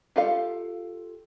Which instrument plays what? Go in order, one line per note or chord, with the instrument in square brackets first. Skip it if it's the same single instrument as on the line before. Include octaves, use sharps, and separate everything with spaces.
[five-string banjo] F4 G4 A4 F5